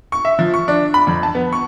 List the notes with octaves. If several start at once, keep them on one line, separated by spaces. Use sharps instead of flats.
C#6
E5
F3
C#6
D4
B5
F2
A5
B3
C#6